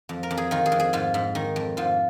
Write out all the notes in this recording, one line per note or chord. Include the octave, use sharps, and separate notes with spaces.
F2
A#4
F2
G#4
D#3 F4
G#4
F2
G#4
G#2 F4
G#2
D#3
F2
G#2 F4